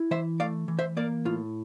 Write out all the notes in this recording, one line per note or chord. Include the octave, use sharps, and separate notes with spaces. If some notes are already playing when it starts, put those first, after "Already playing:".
Already playing: E4
E3 C5 E5
A3 D5 F5
E3
C5 E5
A#3 A#4 D5
A2 F4